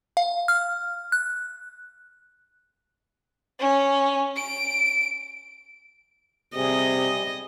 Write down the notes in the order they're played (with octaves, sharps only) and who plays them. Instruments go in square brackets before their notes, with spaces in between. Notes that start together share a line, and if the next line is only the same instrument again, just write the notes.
[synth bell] F5
F6
F#6
[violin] C#4
D7
[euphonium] C3 [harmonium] G3 G#4 [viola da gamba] D#5